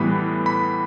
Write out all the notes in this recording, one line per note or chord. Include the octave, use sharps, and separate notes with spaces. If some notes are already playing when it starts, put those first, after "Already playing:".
Already playing: A2 E3 G3 B3 B5
B5